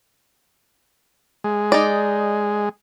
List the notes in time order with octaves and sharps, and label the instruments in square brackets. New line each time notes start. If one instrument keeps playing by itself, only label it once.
[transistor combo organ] G#3
[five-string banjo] D#4 D5